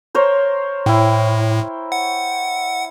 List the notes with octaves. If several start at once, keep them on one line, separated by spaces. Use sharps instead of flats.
A#4 C5 C#5
A2 E4 G5
F#5